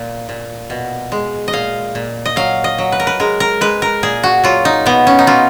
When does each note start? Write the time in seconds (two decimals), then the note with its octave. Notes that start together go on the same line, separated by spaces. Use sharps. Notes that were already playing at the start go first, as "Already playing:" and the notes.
Already playing: A#2
0.29 A#2
0.70 B2
1.12 G#3
1.48 D#5
1.53 A#2 F5
1.95 A#2
2.25 D#5
2.36 F#3 F5
2.64 D#5
2.78 F#3
2.92 B4
3.00 A#4
3.07 B4
3.20 G#3 A#4
3.40 A#4
3.61 G#3 B4
3.82 A#4
4.03 A#2 G#4
4.23 F#4
4.44 F#3 F4
4.65 D#4
4.86 B2 B3
5.07 C#4
5.19 D#4
5.27 F#3 F4